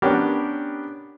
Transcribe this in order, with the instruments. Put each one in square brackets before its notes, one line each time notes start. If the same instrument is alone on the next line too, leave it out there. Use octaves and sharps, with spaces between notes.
[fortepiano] B3 C#4 D4 G4 A#4